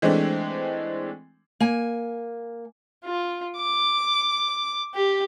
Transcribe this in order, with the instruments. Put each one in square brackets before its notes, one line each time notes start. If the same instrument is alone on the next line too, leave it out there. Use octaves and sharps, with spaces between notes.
[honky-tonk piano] E3 G#3 A3 C4 D4
[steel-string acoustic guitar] A#3 G#5
[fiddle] F4
D6
G4